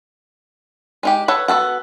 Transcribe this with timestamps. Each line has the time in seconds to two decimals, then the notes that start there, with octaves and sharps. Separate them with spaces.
1.03 G#3 D#4 G4
1.28 A4 B4 C#5 F#5
1.48 B3 F#4 A4 F#5